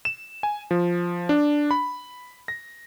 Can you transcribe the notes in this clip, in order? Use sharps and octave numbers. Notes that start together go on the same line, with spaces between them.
E7
G#5
F3
D4
B5
A#6